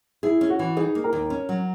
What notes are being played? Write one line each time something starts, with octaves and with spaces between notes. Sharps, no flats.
E4 G#4
C#4
F#4
E3
D#4 G#4
A#3
A#4
D#2
C#4
F#3